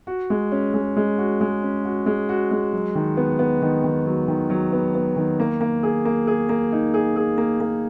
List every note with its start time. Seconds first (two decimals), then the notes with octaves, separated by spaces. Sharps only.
0.07 F#4
0.30 G#3
0.52 C#4
0.74 G#3
0.97 G#3
1.18 F#4
1.41 G#3
1.63 C#4
1.85 F#4
2.06 G#3
2.29 F#4
2.51 G#3
2.73 F#3
2.95 D#3
3.17 B3
3.39 B3
3.62 D#3
3.84 D#3
4.06 F#3
4.28 D#3
4.50 F#3
4.73 B3
4.95 B3
5.17 D#3
5.40 A#3
5.61 A#3
5.83 G#4
6.05 A#3
6.27 G#4
6.49 A#3
6.72 D#4
6.94 G#4
7.16 G#4
7.38 A#3
7.60 A#3